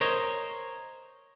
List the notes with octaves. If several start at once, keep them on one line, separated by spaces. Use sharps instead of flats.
A#4 C5 C#5 D#5